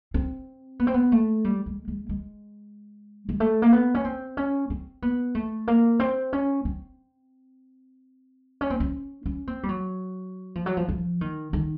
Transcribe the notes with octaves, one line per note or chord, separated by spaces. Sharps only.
C4
B3
C4
B3
A3
G3
G#3
G#3
G#3
G#3
A3
A#3
B3
C#4
C4
C#4
C4
B3
A3
A#3
C4
C#4
C4
C#4
C4
C#4
C#4
C4
G3
F#3
F3
F#3
F3
F3
D#3
D#3